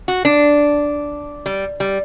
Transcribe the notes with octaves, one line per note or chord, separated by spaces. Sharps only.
F#4
D4
G3
G3